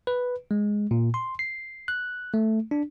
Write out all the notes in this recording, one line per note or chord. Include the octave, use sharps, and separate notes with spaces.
B4
G#3
A#2
C6
C7
F#6
A3
D4